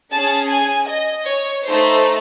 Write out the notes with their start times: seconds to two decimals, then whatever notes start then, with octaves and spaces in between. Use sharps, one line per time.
0.11 C#4 G#4 A5
0.50 G#5
0.88 D#5
1.27 C#5
1.66 A3 D#4 A4 C5